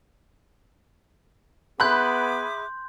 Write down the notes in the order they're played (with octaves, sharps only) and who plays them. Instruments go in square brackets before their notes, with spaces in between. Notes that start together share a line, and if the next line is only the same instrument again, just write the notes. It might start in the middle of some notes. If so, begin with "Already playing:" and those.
[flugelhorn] B3 [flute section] G#4 E5 D6 [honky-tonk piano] B5 F#6 [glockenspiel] C6 G6